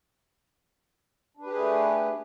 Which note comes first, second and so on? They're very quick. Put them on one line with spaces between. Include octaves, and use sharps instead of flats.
D4 B4 G4 G#4 A3